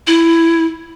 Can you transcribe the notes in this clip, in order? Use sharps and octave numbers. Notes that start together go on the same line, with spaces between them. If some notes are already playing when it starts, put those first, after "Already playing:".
E4